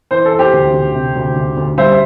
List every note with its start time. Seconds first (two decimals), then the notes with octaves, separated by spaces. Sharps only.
0.11 E3 C5
0.25 A4
0.32 E3
0.39 G4 C5
0.53 D2
0.73 D2
0.94 C3
1.15 D2
1.36 D2
1.57 D2
1.78 G3 C5 E5